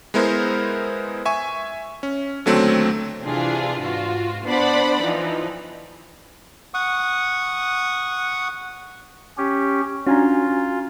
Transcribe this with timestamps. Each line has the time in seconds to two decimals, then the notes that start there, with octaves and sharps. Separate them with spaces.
0.14 G#3 B3 E4 A#4 C5
1.25 E5 G#5 C#6
2.03 C#4
2.46 D#2 D3 F#3 A3 C4
3.21 C3 E3 D4 F4 G#4
3.82 G#2 F4 F#4
4.44 B3 D4 C5 D5 F#5 B5
5.02 E3 F3 D#4
6.74 F#5 C#6 D#6
9.38 C#4 G4
10.07 C#4 D4 F4 F#4 G#5 A#5